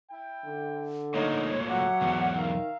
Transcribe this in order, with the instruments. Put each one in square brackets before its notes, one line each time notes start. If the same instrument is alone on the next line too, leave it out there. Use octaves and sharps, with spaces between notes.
[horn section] E4 G5
[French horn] D3
[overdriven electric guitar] D2 A#2 [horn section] D#4 [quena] C#5
[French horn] F#3 [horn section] G4 C#5 E5 [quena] F#5
[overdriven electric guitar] B1 E2
[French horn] D#3 [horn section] E5 F5 A#5